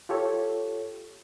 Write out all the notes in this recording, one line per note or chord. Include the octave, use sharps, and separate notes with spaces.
F4 G4 A4 C#5